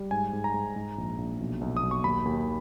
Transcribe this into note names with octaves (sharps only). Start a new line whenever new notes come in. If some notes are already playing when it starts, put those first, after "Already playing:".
Already playing: G3
G#2 G#5
G#2
A#5
G#2
G#2
A#1
A#1
B1
B1
D#6
B1
C#6
D#2 B5
D#2